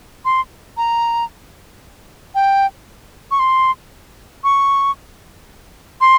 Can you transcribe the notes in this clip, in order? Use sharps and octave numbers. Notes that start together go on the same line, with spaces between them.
C6
A#5
G5
C#6
C6
C#6
C6